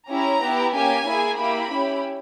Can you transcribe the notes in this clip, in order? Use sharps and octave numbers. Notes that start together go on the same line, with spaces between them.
C#4 E4 G4 A#5
B3 E4 G4
A#3 C#4 G4 G#5
A#3 E4 G#4
A#3 E4 G4 B5
C#4 E4 G4